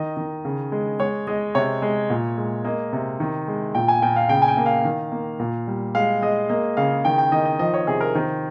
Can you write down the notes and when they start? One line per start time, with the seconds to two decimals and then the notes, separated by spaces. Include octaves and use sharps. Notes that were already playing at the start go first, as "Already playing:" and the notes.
Already playing: D#3 D#5
0.17 D#3
0.45 C#3
0.72 G#3
0.99 G#3 C#5
1.27 G#3 D#5
1.55 C3 C#5
1.82 G#3
2.10 A#2
2.37 G#3
2.65 A#3 D#5
2.93 C3
3.20 D#3
3.48 G#3
3.75 A#2 G5
3.88 G#5
4.02 A#2 G5
4.16 F5
4.29 C#3 G5
4.42 G#5
4.48 G5
4.57 A#3
4.66 F5
4.85 D#3
5.12 A#3
5.40 A#2
5.67 G3
5.95 G#3 F5
6.22 G#3 D#5
6.49 A#3 D#5
6.77 C#3 F5
7.05 D#3 G5
7.18 G5
7.32 D#3 D#5
7.45 D#5
7.59 F3 D#5
7.74 C#5
7.87 C3 G#4
8.01 A#4
8.15 D#3 C5